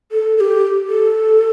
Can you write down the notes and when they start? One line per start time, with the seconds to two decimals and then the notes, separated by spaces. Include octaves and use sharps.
0.12 A4
0.37 A4
0.41 G4
0.88 A4